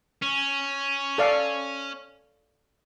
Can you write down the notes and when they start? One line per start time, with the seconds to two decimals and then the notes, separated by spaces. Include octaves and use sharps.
0.22 C#4
1.18 A4 D5 F5